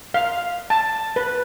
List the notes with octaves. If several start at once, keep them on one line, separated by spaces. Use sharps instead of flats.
F5
A5
B4